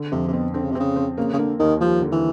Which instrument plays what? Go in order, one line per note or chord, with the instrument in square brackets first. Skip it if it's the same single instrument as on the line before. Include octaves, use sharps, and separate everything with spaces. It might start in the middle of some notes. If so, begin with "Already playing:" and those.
Already playing: [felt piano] D3
[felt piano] F2 [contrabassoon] C3
[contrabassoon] C3
[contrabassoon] B2 [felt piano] C4
[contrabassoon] D3 [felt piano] C4
[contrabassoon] C#3
C3
[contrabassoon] C#3 [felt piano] C4
[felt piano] C4
[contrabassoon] C#3 [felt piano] A#3
[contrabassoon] C#3
[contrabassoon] D3 [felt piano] A#3
[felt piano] D#2 [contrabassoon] D#3
[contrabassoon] F3 [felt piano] G3
[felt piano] D3
[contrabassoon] E3